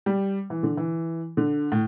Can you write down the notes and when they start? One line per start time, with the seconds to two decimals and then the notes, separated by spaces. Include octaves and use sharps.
0.06 G3
0.50 E3
0.63 D3
0.77 E3
1.37 D3
1.72 A2